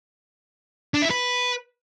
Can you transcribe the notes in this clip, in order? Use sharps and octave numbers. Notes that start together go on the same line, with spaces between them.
D4
E4
B4